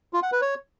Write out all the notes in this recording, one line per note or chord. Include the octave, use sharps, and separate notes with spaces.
F4
F#5
B4
C#5